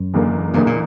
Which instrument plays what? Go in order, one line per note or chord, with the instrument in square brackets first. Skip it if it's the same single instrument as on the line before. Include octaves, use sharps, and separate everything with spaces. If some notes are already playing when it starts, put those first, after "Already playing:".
Already playing: [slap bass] F#2
[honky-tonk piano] F#1 E2 D3 A#3
[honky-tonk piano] F#1 E2 D3 A#3 [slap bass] G2
[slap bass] A#2